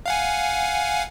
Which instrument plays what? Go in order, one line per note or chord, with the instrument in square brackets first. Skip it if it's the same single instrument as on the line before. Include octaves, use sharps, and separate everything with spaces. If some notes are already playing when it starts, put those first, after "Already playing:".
[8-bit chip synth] F5 F#5 G#5